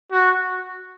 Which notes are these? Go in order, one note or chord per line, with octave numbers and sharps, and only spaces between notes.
F#4